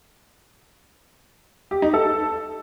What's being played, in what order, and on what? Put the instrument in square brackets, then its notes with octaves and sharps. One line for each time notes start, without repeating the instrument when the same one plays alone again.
[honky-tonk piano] G4
D#4
A4